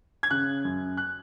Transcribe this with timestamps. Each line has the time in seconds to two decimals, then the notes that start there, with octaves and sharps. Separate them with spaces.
0.23 G#6
0.30 C#3 F#6
0.64 F#2
0.97 F#6